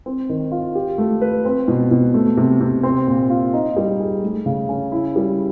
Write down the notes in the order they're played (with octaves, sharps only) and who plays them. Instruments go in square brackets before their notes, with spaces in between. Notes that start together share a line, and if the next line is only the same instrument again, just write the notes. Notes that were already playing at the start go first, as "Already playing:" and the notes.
[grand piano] C4
D#3
F4
G4
A3
B4
C4
B2
B2
A3
C3
C3
C4
A#2
F4
D#4
G3
G#4
A3
C#3
C#4
E4
G3